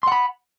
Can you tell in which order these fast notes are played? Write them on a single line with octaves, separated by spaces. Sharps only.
C6 F#5 B5